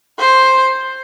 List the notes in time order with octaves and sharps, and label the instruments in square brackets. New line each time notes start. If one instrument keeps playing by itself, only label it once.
[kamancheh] C5